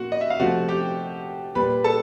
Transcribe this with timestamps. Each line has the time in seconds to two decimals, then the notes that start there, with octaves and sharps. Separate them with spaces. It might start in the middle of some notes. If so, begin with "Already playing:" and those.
Already playing: A#2 F#4 F#5
0.12 D#5
0.21 E5
0.30 F5
0.40 C3 F3 A3 F#4 F#5
0.68 G4 G5
1.55 A#2 G3 B4 B5
1.84 A4 A5